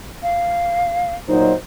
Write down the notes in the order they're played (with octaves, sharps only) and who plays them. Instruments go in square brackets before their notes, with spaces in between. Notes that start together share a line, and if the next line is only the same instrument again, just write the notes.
[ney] F5
[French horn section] A#2 F#3 D#4 [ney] C5